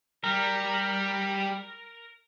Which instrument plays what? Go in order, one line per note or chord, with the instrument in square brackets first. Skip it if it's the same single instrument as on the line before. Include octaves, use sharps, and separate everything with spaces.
[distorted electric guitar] G3 [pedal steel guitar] A#4